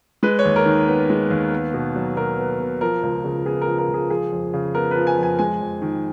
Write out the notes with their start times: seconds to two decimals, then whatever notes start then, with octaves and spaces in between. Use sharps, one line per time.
0.23 G#3 B4
0.39 C#5
0.45 D#2
0.56 A#4
0.66 D#3
0.88 B3
1.10 G#3
1.30 D#2
1.52 B3
1.74 B2
1.96 F#3
2.16 B2 A#4
2.38 B3
2.60 B2
2.81 F3 A#4
3.03 C#2
3.24 C#3
3.45 B3 G#4
3.62 A#4
3.67 F3
3.78 A#4
3.89 C#2
3.94 G#4
4.10 F3 G#4
4.32 F2
4.54 C#3
4.75 B3 A#4
4.91 F3 B4
5.07 G#5
5.18 F2 G#5
5.39 G#3 G#5
5.61 F2
5.82 D#3